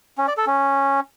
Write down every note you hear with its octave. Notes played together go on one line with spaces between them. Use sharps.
C#4
D5
A4
C#4